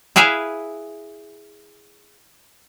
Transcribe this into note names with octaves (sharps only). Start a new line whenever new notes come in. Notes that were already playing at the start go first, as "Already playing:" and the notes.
E4 G#4 B4 E5 F5